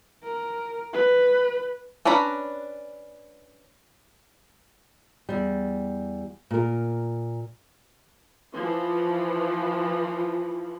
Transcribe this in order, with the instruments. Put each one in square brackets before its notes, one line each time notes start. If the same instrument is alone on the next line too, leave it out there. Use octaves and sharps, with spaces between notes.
[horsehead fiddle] A#4
B4
[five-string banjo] C#4 D4 B4 A#5 B5
[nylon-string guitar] E2 G3
A#2 A#4
[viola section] E3 F3